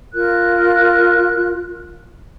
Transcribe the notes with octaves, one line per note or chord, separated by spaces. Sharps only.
F4 A#4 F#6